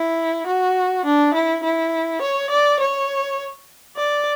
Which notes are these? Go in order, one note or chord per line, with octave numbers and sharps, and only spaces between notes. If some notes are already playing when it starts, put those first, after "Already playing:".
Already playing: E4
F#4
D4
E4
E4
C#5
D5
C#5
D5